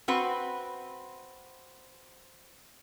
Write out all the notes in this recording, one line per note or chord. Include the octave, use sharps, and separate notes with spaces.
C4 F#4 B4